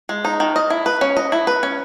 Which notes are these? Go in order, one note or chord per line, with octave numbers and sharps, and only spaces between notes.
G#3
D#4
D#3
D#5
E4
B4
C#4
D#5
E4
B4
C#4